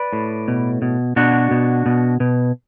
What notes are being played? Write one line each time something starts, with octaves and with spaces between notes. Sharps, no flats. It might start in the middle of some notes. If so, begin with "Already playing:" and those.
Already playing: B4 D5
A2
B2
B2
B2 D4 F#4
B2
B2
B2